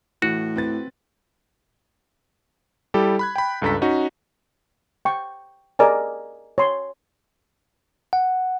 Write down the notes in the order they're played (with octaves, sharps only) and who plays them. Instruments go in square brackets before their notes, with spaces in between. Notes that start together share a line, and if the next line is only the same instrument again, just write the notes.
[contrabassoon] A2 [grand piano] E3 [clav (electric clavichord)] F#4
[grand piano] C4 B4 A6
[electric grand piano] G3 E4 G4 A4
B5 F#6 G#6
G5 B5
C#2 G2 A4 A#5 B6
C#4 D#4 F#4
[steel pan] G5 C#6
G#4 A#4 D5 D#5 G#5
C#5 C6
[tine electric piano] F#5